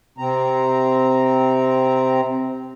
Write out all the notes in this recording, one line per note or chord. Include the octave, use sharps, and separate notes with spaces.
C3 C4 A#5